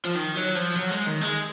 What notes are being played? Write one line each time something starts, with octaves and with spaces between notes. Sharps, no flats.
F3
D#3
F#3
F3
F#3
G#3
D#3
G#3